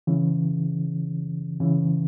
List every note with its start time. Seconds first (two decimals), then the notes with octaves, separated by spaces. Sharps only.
0.07 C#3 E3
1.60 C#3 E3